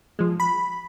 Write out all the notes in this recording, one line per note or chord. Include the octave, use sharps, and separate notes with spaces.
F3 G#3
B5